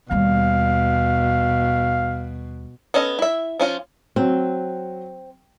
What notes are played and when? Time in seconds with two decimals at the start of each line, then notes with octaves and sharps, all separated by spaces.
0.11 D#2 B2 G3 F5
2.94 B3 C#4 A4 D#5
3.19 E4 E5
3.60 F3 C#4 F4
4.16 F#3 C4